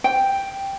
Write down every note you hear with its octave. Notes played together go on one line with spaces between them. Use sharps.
G5